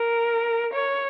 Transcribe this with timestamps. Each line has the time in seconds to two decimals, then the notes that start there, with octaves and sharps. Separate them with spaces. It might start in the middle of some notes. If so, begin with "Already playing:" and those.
Already playing: A#4
0.73 C#5